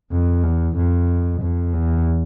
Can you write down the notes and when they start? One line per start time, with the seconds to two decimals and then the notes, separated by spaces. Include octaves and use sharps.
0.12 F2
0.44 E2
0.77 F2
1.41 F2
1.73 E2